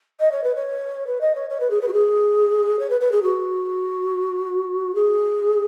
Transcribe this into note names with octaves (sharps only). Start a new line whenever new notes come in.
D#5
C#5
B4
C#5
B4
D#5
C#5
C#5
B4
G#4
B4
F#4
G#4
C#5
B4
B4
G#4
F#4
G#4